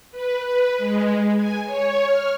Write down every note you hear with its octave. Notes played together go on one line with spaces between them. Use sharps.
B4
B4
G#3
G#5
C#5
F6